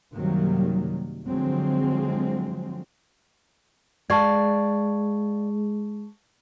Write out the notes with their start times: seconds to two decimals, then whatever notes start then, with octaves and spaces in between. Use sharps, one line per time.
0.15 F#2 C3 D#3 F#3 G3 A#3
1.26 D3 F3 F#3 G#3 C4
4.10 G#3 D5 F5 A5 C#6 G#6